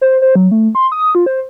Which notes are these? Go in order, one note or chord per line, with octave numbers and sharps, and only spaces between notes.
C5
C5
F#3
A3
C6
D#6
F4
C5